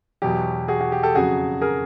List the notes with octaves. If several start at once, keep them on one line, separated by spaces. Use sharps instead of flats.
E2 B2 F#3 G4
F#4 G#4
F#4
G4
G4 A4
F2 C#3 F#3 F#4 G#4
G#4 A#4